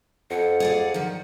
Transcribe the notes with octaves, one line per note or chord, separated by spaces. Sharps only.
F2 F#5
G#4 D5 F5
D#3 F3